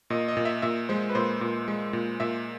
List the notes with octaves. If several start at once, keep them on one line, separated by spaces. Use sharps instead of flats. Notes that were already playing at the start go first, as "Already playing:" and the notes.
A#2 D#5
D#5
A#2
E5
A#2 E5
G#3 C5
B4
A#2 C5
A#2
G#3
A#2
A#2 E5